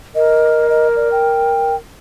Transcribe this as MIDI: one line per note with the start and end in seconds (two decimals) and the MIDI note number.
0.15 1.73 70
0.15 0.69 75
0.69 0.87 75
0.96 1.09 74
1.12 1.75 79